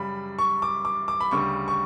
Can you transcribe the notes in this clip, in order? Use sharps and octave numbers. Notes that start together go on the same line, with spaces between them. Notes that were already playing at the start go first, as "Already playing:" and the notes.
Already playing: F#2 C#3 G3 B5
C#6
D6
D6
D6
B5
D2 C#3 G3 C#6
C#6